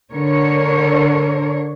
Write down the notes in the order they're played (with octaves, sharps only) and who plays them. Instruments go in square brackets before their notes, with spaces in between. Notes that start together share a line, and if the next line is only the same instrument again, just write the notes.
[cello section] D3 D4 A#4 C#5